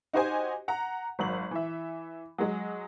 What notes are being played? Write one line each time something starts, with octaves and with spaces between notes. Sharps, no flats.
D#4 F#4 G4 C5 D#5 G#5
F#5 A#5
G#1 F#3 F#7
E3 E5
F#3 G#3